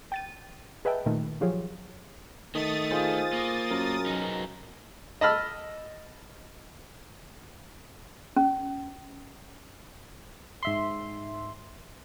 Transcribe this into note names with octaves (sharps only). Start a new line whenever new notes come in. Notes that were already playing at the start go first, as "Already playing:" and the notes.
G5 A6 D#7
G#4 B4 D#5 E5 G5 A5
A#2 D#3 A3
F3 F#3 F4 G4 G#4 C#5
D#3 A3 D#6 A6
F4 G#4 C5
A#3
F#2 A#4
F#3 D#4
D#5 A5 B5 E6 F6
C#4
G#2 E5 C6